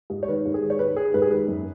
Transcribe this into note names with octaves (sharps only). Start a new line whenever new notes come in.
G#2
C#5
D#3 B4
G#2
G#4
D#3
C#5
D#3 B4
D#3 G#4
G#2 B4
G#4
D#3 B4
F#2